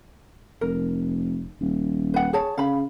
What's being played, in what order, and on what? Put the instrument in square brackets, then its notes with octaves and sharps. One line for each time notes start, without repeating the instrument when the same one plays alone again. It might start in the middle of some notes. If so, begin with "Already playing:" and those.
[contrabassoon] F1 [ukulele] A#4
[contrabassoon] D#1
[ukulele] B4 F#5
G#4 C#5 A5
[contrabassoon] C#3 [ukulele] F5 B5